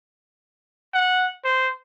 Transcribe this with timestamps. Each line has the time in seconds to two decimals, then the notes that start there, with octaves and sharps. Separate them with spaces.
0.94 F#5
1.45 C5